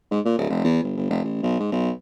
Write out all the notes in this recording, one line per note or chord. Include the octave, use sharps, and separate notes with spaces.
G#2
A#2
D1
F1
E2
G1
G1
F1
A1
B1
G#2
B1